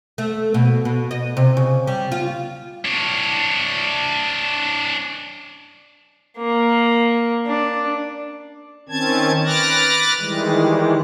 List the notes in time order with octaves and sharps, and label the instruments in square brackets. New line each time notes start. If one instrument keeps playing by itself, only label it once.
[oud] A3
B2
B2
D#5
C3
C#3
G3
F4
[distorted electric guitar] D4 C#5
[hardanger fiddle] A#3
D4
[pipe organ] D#3 C4 C#4 A5 G#6
B4 D6 F6 F#6 A6 A#6
D#3 E3 G3 G#3